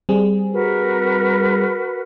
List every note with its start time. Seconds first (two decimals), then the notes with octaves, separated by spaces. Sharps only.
0.09 G3 C4 G#4
0.53 F#4 A#4 B4